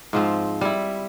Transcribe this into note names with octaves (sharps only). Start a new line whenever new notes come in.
G#2 F3 C4
G3 E4